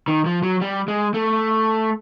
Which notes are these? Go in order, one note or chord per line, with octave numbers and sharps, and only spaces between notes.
D#3
F3
F#3
G3
G#3
A3